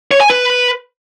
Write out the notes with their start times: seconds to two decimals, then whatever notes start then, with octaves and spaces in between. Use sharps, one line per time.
0.11 C#5
0.21 G#5
0.30 B4